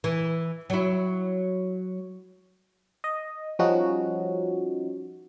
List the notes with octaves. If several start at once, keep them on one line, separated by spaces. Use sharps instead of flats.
E3
F#3 E4
D#5
F3 G3 C#4 D#4 F#4